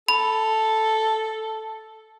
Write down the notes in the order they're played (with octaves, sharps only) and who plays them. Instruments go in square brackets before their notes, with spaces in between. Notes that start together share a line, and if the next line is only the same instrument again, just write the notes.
[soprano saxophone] A4 [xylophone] B5